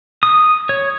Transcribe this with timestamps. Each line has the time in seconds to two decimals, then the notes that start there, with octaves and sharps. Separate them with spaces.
0.23 D#6
0.69 C#5